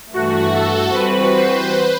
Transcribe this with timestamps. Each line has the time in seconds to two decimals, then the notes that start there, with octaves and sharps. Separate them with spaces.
0.14 G2 E3 A3 F#4
0.54 A4
0.94 E3 G3 C4 F#4 B4
1.33 C5